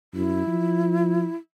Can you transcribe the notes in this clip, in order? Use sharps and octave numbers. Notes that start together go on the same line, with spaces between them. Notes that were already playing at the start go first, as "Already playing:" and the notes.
F#2 E4
F3